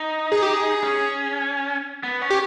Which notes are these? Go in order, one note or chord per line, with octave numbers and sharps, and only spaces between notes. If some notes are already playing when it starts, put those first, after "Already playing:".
Already playing: D#4
G#4
G4
G#4
C#4
B3
C#4
G4